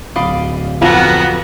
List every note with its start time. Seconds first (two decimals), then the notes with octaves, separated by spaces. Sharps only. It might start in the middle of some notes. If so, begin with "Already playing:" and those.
0.16 D1 D5 D#5 F5 B5
0.81 F2 B3 F#4 A4 A#4 F5